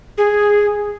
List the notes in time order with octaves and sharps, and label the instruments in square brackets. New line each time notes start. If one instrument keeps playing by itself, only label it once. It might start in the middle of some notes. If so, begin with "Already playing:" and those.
[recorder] G#4